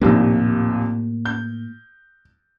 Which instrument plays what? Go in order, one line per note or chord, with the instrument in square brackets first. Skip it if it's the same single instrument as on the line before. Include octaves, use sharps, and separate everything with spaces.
[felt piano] A#1 D#2 C3 [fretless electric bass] A2 A#3
[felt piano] G6